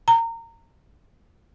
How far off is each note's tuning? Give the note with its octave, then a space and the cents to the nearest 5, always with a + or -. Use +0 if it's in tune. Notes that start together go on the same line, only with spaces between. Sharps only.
A#5 -25